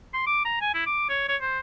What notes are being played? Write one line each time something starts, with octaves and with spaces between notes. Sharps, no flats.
C6
D6
A#5
G#5
E4
D6
C#5
C#5
C5